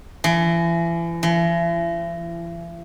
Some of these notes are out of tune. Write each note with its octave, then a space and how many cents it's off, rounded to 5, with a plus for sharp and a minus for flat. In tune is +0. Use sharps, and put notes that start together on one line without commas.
E3 +35
E3 +45